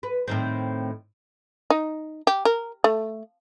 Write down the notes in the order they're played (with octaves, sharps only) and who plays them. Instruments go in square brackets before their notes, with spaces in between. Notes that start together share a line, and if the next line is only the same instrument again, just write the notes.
[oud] B4
A2 D#3 C4
[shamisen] D#4
G4
A#4
A3